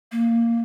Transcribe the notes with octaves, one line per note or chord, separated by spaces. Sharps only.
A#3